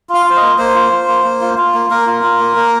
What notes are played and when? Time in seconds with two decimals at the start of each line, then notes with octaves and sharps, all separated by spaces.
0.09 F4
0.14 F5
0.26 F4 C5
0.37 D#5
0.42 A#3
0.58 A#3 C5
0.75 F4
0.91 F4
1.08 A#3
1.24 A#3
1.41 F4
1.58 F4
1.74 A#3
1.90 A#3 A#4
2.07 F4
2.23 F4
2.40 A#3
2.56 A#3